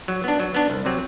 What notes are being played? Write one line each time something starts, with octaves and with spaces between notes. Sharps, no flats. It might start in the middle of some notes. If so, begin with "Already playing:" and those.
F#3
B3 D4
F#3
B3 D4
C2
C3 F#3 C4